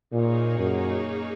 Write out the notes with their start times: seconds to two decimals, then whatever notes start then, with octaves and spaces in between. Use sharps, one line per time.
0.13 A#2 A#3 D#4 G#4 C#5
0.59 F#2